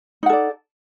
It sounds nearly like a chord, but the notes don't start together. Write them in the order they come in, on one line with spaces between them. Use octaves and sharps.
D#4 F#5 A4 D5